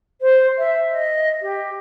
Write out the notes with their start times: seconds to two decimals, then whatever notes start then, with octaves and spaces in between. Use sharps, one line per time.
0.21 C5
0.58 E5
0.91 D#5
1.42 G4